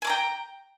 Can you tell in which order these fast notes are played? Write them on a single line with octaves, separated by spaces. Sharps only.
G#5 D6 A#5 G5